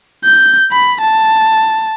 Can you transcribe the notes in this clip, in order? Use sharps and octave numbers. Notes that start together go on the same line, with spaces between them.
G6
B5
A5